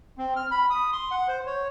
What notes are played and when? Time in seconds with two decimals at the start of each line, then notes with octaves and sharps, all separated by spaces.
0.18 C4
0.36 F6
0.51 B5
0.70 D#6
0.92 C6
1.11 F#5
1.28 C5
1.46 C#5